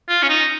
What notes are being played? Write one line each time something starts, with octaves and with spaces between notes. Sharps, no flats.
F4
C#4
D#4